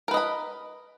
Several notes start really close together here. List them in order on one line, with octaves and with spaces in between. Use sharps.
A#4 B4 D#5 B5